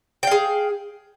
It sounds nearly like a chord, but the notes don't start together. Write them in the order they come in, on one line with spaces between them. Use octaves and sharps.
G5 F5 G#4